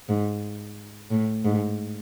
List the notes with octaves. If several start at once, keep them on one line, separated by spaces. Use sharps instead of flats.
G#2
A2
G#2